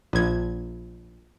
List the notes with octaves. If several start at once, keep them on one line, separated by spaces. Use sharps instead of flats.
A#1 G#6